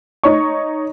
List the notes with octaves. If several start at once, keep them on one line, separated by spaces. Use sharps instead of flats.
D#4 C#5 C#6